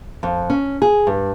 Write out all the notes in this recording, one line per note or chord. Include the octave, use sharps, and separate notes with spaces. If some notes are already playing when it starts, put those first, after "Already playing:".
F2
C#4
G#4
G2